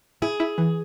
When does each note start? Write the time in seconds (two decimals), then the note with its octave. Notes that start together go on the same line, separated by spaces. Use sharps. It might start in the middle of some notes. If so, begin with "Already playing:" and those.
0.22 E4 G#4
0.40 E4
0.58 E3